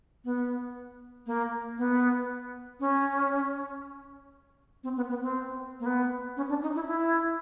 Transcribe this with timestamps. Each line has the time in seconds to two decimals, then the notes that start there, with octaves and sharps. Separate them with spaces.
0.24 B3
1.26 A#3
1.78 B3
2.80 C#4
4.83 C4
4.96 B3
5.09 B3
5.22 C4
5.80 A#3
5.86 B3
6.37 C#4
6.49 D4
6.62 D#4
6.75 E4
6.87 E4